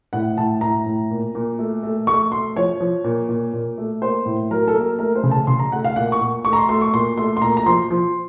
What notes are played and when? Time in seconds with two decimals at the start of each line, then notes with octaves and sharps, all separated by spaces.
0.13 A2 F#5
0.37 A2 A5
0.61 A2 A#5
0.86 A2
1.11 A#2
1.35 A#2
1.59 A3
1.83 A3
2.07 A3 C#6
2.32 A3 C6
2.56 F3 C#5
2.80 F3
3.04 A#2
3.29 A#2
3.53 A#2
3.78 A3
4.02 A#3 C5
4.26 A2
4.50 F#3 A#4
4.68 A4
4.75 A#3 A#4
4.99 A3 A#4
5.15 C5
5.24 C#3
5.31 A5
5.47 C#3 C6
5.59 A#5
5.72 A3 F#5
5.85 F5
5.96 A#2 F#5
6.12 C#6
6.21 A#2
6.45 A3 C#6
6.53 A#5
6.57 C6
6.69 A3 C6
6.81 C#6
6.93 A#2 C6
7.17 A3 C6
7.37 C6
7.42 A#2 A#5
7.57 A#5
7.66 F3 C6
7.90 F3